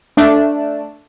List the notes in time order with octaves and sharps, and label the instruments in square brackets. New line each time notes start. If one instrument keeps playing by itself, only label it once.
[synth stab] A3 D4